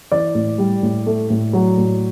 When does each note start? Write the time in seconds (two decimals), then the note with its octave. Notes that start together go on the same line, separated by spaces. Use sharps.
0.12 E3 D5
0.35 A2
0.58 G3
0.83 A2
1.06 A3
1.30 A2
1.53 F#3
1.77 A2